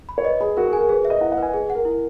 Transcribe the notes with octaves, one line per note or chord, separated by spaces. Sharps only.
B5
C#5
B4 D#5
G#4 B5
F#4 A#4
G#4
G#5
A#4
G#4 B4
E5
D#5
E4 F#5
F#5
B4 G#5
G#4
F#5
A#4
E4